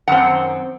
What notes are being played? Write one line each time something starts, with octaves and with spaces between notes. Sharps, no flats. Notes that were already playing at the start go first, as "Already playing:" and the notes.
F#2 D#3 C4 F#5